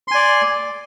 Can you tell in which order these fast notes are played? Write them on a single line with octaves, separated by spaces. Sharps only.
C6 G#5 D5